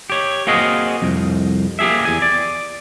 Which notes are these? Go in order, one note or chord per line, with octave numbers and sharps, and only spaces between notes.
G4 C#5
A#3 C4 F#4 G#4 D#5 F5
C2 F2
A#3 G4 G#4 E5
E2 G#5
D5